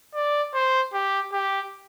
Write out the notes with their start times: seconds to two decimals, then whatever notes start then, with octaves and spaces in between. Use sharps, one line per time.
0.14 D5
0.54 C5
0.93 G4
1.33 G4